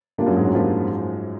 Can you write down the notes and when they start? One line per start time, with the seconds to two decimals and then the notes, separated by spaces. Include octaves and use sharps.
0.18 A#2 G3 A#3 D4 F4
0.26 F#2 F#3
0.36 G#2 G#3
0.45 F#2 F#3
0.53 A#2 F3 G3 A#3 D4 F4